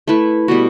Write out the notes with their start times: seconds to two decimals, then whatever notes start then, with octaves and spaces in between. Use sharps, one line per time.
0.07 A3 E4 B4
0.48 B2 G3 B3 F#4